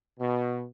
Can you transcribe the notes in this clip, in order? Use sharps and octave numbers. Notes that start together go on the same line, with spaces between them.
B2